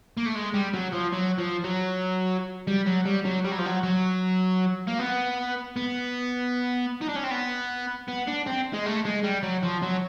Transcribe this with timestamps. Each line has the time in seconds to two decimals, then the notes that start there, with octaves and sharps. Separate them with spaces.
0.17 A#3
0.26 A3
0.35 G#3
0.54 G3
0.74 F#3
0.93 F3
1.13 F#3
1.38 F3
1.64 F#3
2.67 G3
2.87 F#3
3.06 G3
3.25 F#3
3.45 G3
3.52 F#3
3.59 F3
3.66 F#3
3.83 F#3
4.87 A#3
4.99 B3
5.77 B3
7.01 D#4
7.09 D4
7.16 C#4
7.24 C4
7.31 B3
8.08 B3
8.28 D4
8.47 C4
8.74 G#3
8.86 A3
9.06 G#3
9.24 G3
9.43 F#3
9.63 F3
9.83 F#3